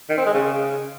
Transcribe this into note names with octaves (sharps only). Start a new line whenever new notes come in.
D#3
C4
G#3
C#3